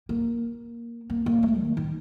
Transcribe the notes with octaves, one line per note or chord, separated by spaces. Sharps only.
A#3
A#3
A#3
A3
D#3
D#3